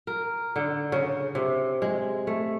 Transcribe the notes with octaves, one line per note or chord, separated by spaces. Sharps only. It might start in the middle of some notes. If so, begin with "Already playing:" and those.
A#4
D3
C#3
C3
G#3
A3